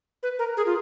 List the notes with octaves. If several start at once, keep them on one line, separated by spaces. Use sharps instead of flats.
B4
A#4
G#4
F4